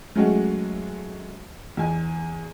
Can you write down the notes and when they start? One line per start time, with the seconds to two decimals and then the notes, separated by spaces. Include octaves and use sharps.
0.15 F#3 G#3 A3 C#4 F#4
1.77 E2 G#5